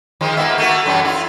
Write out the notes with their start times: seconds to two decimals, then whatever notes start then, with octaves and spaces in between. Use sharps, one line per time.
0.21 D#3 F3 G#3
0.37 A#3 B3 E5
0.58 A3 A#3 F#4
0.86 F#2 E3 G3
1.05 E4 F4